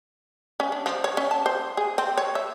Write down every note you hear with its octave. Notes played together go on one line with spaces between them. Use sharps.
C#4
D4
F3
C#5
C#4
A5
C5
G#4
C4
C#5
E5